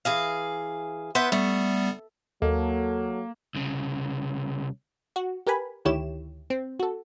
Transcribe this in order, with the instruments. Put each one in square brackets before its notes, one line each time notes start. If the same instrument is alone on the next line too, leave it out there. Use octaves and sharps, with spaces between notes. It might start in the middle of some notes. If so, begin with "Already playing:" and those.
[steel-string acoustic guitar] E3 G#4 F5
[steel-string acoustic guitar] B3 B4 E5 [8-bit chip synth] C6 G6
[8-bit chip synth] G3 B3 [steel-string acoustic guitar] A3
[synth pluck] D#2 [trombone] F#3 [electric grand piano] A#3 [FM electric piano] A4
[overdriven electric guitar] C2 C#3
[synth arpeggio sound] F#4
G4 A#4 B4 G#5 B5
D2 D#3 E4 G4 C#5 E7
C4
F#4 A4